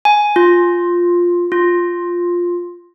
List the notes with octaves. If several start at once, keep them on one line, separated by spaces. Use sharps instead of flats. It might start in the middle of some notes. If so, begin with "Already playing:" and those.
G#5
F4
F4